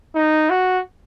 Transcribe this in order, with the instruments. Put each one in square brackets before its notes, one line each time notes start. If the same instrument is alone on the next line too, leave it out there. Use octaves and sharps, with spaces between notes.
[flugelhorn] D#4
F#4